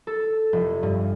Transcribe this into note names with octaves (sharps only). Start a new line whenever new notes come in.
A4
F1
G2